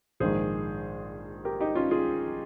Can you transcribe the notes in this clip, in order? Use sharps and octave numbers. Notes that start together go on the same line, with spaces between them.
A#1 G#2 D#3 G#4 C5
G4 A#4
D#4 G4
C#4 F4
F4 G#4